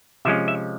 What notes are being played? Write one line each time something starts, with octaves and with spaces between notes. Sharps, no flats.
C3 F3 G#3 C#4 E5
E5